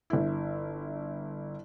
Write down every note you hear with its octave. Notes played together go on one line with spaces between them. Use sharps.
G1 E4